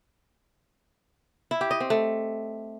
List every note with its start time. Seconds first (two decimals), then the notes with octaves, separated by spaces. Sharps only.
1.51 E4
1.61 G4
1.71 D#5
1.80 C4
1.90 A3